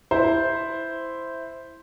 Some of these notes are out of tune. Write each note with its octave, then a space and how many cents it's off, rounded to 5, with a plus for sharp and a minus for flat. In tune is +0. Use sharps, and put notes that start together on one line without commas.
E4 +0 C5 +0